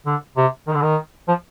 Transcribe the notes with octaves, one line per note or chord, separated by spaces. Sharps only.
D3
C3
D#3
D3
D#3
F3